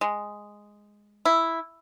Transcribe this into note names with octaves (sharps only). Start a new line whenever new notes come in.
G#3
E4